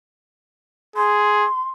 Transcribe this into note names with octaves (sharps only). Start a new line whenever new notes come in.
G#4 C6